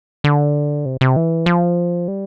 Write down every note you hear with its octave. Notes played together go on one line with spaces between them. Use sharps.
D3
C3
C3
E3
F3
G3